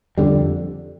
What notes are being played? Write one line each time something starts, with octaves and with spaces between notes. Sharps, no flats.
F2 D3 G3